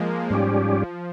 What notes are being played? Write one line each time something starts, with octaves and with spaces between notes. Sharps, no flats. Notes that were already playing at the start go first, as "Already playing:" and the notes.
Already playing: F3 G#3 A#3
G#2 F3 G3 C#4 G4